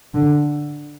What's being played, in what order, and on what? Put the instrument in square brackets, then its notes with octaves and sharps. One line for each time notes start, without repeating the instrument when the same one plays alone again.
[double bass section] D3